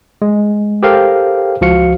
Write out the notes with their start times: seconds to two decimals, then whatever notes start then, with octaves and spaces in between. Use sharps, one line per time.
0.22 G#3
0.83 G4 A4 A#4 C5 F5 G5
1.61 C#2 F3 F#4 F5 C#7